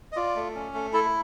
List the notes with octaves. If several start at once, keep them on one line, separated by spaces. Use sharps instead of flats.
D#5
F4 D5
A3
C#4
A3
E4 A4